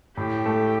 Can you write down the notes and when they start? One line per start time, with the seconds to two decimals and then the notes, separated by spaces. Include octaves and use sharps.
0.17 A2 G4
0.46 A3